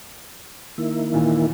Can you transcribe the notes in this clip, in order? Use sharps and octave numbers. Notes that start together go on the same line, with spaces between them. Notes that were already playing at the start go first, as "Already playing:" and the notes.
D#3 A#3 E4
D#2 A#2 E3